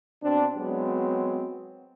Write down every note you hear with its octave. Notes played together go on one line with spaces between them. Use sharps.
B2 C4 D4
F#3 G#3 B3 C4